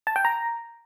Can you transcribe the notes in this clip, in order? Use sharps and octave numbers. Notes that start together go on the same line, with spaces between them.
A5
G5
A#5